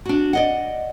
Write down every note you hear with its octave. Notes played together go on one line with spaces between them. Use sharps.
D4 F#4
D5 D#5 F#5